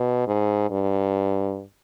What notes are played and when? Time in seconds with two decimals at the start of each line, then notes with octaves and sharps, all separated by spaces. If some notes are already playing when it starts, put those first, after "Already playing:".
Already playing: B2
0.27 G#2
0.71 G2